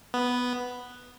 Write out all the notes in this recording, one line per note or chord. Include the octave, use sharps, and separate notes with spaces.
B3